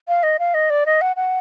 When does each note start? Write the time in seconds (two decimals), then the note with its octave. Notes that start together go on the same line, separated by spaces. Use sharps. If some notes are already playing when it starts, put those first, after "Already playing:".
0.08 F5
0.23 D#5
0.39 F5
0.54 D#5
0.70 D5
0.86 D#5
1.01 F#5
1.16 F#5